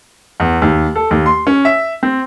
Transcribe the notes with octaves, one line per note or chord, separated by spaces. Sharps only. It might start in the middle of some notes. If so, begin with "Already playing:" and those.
E2
D#2
A4
D#2
C6
C#4
E5
C4